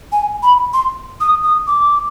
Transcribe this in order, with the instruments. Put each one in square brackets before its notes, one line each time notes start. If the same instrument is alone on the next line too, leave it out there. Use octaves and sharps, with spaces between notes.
[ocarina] G#5
B5
C6
D#6
D#6
D6